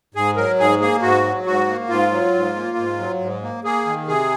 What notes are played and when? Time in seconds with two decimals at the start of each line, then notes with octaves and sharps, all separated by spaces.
0.15 G#2 G#4
0.36 F#3 A#4
0.58 G#2 G#4
0.80 A#3 G#4
1.02 G#2 F#4
1.24 F#3
1.46 G#2 F#4
1.68 A#3
1.89 G#2 F4
2.11 F#3
2.34 G#2
2.56 A#3
2.77 G#2
2.99 F#3
3.21 G#2
3.42 A#3
3.64 A#3 G#4
3.86 D#3
4.08 C3 G#4